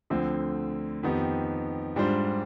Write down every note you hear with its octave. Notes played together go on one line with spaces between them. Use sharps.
D2 D3 F3 C4
F2 D#3 B3 D#4 G4
G#2 G3 D4 F4 C5